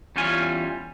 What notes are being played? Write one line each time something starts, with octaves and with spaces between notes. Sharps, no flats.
E2 G3 C#4 F4 G#5